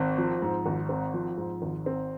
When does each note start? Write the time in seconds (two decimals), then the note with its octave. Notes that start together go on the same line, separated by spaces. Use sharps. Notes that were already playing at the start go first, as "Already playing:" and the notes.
Already playing: G#1 C4
0.18 F3
0.42 G#2
0.66 G#1
0.89 C4
1.14 F3
1.37 G#2
1.62 G#1
1.86 C4